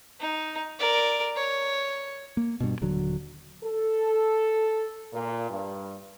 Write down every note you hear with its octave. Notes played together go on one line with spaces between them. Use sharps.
D#4
A#4 D5
C#5
A#3
G2 B2
D#1 D3 F#3
A4
A#2
G2